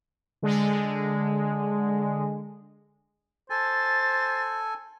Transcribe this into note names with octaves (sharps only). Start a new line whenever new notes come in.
D3 G#3
A4 C5 G#5 A6